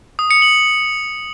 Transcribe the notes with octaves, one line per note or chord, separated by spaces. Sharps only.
D#6
C#7
F#7